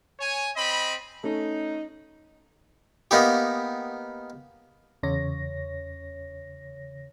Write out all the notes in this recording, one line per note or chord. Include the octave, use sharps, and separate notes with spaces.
C#5 G#5
C4 D#5 B5
A3 C#4 D#4
A#3 B3 D#4 G4
E2 C#3 C#5 A#6